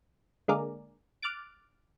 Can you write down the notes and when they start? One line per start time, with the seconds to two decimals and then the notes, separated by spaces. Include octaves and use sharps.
0.48 D3 G#3 A#3 G#4 A#4 D5
1.23 D6 F6 F#6 A6 D7